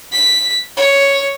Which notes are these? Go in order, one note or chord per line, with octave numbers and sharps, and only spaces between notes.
B6
C#5